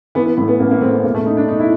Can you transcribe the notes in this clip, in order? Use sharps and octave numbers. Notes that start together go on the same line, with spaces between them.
E3 B3
B3
A2 B3
B3
A1 A#3
A#3
A2 C4
C4
E1 A#3
A3
E1 D#4
D4
E1 D#4
E4